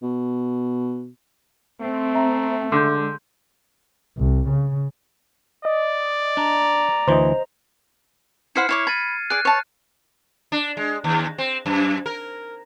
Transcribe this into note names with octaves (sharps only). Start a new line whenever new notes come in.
B2
A3 C4
E5 A#5
D3 G#3 C6 G6
C2
C#3
D5 D#5
D4 A#5
D2 E3 C5 D#5
E4 C5 F#5 F6 C7 C#7
E4 C#5 D6
B5 G#6 A6 D#7
G#4 D5 F#6
C#5 A5
D4
G#3
D#2
C4
F#2
A#4